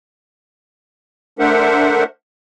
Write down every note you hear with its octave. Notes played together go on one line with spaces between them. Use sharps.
A3 D4 A#4 C5 E5 F#5